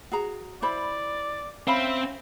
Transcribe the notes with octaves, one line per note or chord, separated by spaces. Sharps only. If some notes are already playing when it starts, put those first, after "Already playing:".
F#4 G#4 A#5
E4 C5 D5 B5
C4 C#4 E5 F5 B5